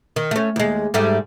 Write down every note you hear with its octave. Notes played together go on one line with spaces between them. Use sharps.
D#3
A3 C#4
D#2 G#3
G#2 G3 A3